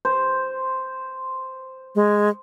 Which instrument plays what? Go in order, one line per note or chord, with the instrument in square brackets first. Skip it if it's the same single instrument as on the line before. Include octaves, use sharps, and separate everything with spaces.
[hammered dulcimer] C5
[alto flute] G#3